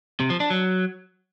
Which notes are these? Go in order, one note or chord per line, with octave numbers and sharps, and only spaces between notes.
C3
F3
D4
F#3